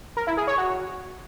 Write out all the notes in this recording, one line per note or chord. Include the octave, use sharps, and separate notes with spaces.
A#4
E4
G#4
C#5
F#4